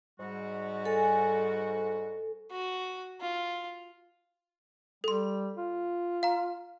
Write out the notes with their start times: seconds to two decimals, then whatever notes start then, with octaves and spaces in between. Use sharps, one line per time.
0.19 G#2 G3 F#4
0.85 A4 G#5
2.51 F#4
3.21 F4
5.04 G3 A4 C6
5.57 F4
6.23 F5 A#5